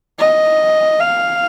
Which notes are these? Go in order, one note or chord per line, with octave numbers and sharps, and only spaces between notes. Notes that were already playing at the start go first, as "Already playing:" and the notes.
D#5
F5